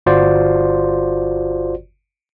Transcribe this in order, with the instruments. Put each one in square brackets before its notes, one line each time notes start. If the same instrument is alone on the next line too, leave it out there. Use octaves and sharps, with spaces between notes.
[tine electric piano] G1 F4 F#4 C5 D5